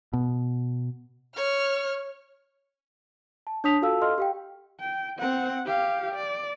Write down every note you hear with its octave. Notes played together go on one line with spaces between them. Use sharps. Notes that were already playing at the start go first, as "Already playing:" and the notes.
B2
C#5 F6
A5
D4 C#5 A5 D#6 B6 F7
F4 F#4 A4 F5 A5 E6
A4 D#5 F5 C6 F6
G4 F5 G5
G5
C4 F#5
G4 F5
D5